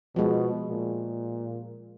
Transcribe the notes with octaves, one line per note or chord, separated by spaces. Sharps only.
B2 F3 G#3
A#2